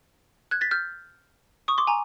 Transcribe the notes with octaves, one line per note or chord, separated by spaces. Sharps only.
F#6 G#6
A6 B6
F6 G6
C#6 D#6
C6 D6
G#5 A#5